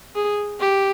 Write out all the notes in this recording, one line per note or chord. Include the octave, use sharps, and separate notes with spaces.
G#4
G4